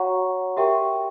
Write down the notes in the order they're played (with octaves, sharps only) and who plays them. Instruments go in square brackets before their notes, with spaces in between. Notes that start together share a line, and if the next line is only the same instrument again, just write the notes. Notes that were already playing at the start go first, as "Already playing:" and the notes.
Already playing: [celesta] F#4 C#5 F#5 A#5 C#6
G4 A#4 E5 G5 C#6